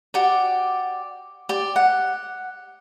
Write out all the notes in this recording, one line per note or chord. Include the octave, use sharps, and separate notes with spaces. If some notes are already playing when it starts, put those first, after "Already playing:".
F#4 G4 D5
G4 D5
F#5